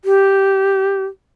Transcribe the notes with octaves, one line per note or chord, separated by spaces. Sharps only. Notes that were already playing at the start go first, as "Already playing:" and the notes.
G4